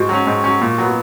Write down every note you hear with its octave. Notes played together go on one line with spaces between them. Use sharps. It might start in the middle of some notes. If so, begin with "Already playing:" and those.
Already playing: G#2 F#4
F#3 C#4
G#2
F#3 C#4
A#2
F#3 B3